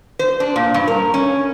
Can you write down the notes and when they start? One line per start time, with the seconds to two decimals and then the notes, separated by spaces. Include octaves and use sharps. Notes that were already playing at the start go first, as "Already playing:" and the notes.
0.19 C5
0.40 D4
0.56 A#2
0.74 G2
0.87 A#4
1.14 C#4